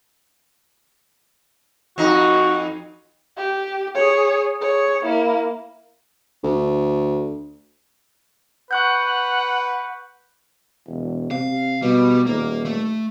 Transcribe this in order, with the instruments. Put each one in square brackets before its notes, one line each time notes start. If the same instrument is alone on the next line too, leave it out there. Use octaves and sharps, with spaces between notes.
[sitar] F2 D#4 [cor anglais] F#4
[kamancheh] G4
G#4 C#5
G#4 C#5
A#3 E4
[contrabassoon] D2
[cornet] B4 [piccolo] F#5 [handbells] C#6 F#6 G6
[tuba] E1
[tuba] C3 [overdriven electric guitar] F5
[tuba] B2 [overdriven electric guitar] G3
[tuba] D#1 [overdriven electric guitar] A#3
[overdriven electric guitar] A3